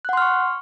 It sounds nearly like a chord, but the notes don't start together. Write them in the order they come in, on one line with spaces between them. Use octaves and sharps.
F#6 F#5 C6 F6 C#6